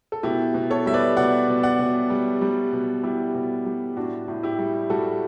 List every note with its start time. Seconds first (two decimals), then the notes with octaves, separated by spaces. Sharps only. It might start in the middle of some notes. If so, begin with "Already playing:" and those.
0.12 A4
0.23 B2 E4 G4
0.54 B2
0.70 A4 C#5
0.86 G3 E5
0.94 B4 D5
1.17 B2 D5 F#5
1.48 B2
1.63 D5 F#5
1.79 B2
2.10 G3
2.41 G3
2.73 B2
3.03 G3 E4 G4
3.35 B2
3.66 G3
3.97 A2 D4 F#4
4.28 A2
4.43 E4 G4
4.59 G3
4.90 G3 F#4 A4